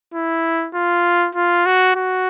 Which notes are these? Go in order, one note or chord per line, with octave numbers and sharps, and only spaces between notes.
E4
F4
F4
F#4
F#4